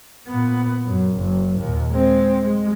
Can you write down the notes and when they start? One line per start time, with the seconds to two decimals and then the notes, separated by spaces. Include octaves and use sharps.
0.28 A#2 B3
0.86 F#2
1.15 F#1
1.59 D#2 A#2
1.92 G#3 C4
2.44 G#3